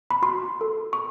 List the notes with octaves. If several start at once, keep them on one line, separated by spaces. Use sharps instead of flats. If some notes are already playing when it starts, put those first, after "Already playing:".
B5
F#4 C6
A4
C#6